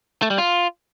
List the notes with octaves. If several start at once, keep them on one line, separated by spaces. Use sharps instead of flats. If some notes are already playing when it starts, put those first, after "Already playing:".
A3
G3
F4